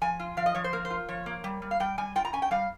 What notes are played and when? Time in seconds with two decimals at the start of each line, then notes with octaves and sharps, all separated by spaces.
0.01 F3 G#5
0.20 F4
0.37 F3 F5
0.46 D#5
0.55 F3 C#5
0.64 C5
0.73 A#3 A#4
0.85 C5
0.90 F4
1.09 F3 C#5
1.26 A#3
1.44 G3
1.62 G3
1.71 F5
1.80 G3 G5
1.98 G3 G#5
2.16 F4 G5
2.25 A#5
2.33 C#4 G#5
2.42 G5
2.51 G3 F5